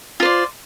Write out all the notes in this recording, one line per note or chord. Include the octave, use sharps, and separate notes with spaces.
F4 C5 D5